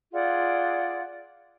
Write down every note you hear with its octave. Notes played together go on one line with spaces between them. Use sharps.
F4 G#4 D5 F#5